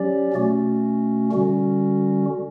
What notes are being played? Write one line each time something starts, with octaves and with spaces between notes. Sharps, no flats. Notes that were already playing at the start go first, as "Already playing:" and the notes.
Already playing: F#3 C#4 G4 D5
B2 A3 C#4 F#4
D3 G3 C#4 F#4